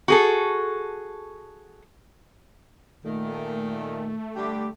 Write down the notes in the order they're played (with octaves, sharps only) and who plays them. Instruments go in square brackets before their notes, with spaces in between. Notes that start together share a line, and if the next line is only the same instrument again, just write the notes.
[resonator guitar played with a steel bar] F#4 G#4 A4
[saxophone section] A#2 D#3 [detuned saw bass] A3
[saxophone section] D3 G3 G4